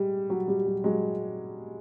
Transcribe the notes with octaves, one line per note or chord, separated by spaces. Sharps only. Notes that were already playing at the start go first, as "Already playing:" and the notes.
Already playing: G3 G#3
F#3
G3
F#3
F#3 G#3